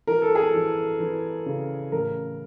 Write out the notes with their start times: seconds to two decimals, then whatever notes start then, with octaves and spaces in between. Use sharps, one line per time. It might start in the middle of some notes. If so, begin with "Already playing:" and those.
0.07 E3 A#4
0.22 A4
0.35 G#4
0.49 E3 A4
1.00 E3
1.46 C#3
1.92 A1 A#4